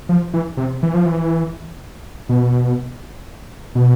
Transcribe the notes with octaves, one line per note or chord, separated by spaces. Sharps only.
F3
E3
C3
E3
F3
E3
B2
B2